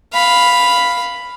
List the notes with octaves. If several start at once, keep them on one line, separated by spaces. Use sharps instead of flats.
F5 B5